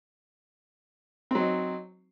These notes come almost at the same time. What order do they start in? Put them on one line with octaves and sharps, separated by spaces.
C4 F#3 D#4